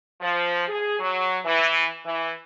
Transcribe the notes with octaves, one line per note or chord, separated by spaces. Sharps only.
F3
G#4
F#3
E3
E3